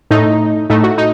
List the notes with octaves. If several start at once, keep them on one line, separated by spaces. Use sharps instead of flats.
A2 A3 D#4
A2 A3 D#4
F#4
D#4